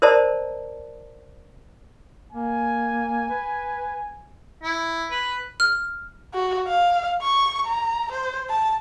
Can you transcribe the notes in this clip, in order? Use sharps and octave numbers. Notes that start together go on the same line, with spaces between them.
A#4 C5 D5 D#5 A5 A#5
A#3 G#5
B4
E4
B4
F6
F#4
F5
C#6
A#5
C5
A5